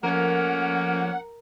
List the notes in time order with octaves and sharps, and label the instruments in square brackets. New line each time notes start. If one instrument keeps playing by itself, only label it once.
[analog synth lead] F3 [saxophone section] A3 A#3 C#4 [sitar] A#4 [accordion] F#5